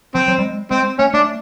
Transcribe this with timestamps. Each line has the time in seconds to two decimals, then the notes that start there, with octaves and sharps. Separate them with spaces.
0.15 F3 C4
0.28 F#3
0.39 G3
0.43 G#3
0.71 G#3 C4
0.99 A3 C#4
1.14 A3 D4